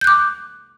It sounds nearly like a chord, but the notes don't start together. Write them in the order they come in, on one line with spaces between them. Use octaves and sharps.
G6 F#6 D6